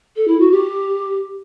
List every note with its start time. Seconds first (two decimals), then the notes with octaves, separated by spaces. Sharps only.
0.16 A4
0.27 E4
0.39 F#4
0.51 G4